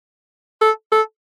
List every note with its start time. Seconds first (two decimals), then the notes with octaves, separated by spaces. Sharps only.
0.61 A4
0.92 A4